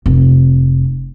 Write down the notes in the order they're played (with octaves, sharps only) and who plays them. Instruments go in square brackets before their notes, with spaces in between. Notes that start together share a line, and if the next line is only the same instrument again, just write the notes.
[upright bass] F1